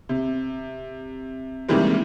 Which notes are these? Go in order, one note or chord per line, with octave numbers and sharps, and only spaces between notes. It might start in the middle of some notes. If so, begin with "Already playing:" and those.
C3
C3 D#3 E3 G3 G#3 A#3